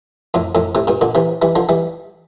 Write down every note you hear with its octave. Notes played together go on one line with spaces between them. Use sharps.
F2 A2
F2 A2
A2 C3
G2 A#2
A#2 D3
C3 E3
E3 G3
D3 F3
E3 G3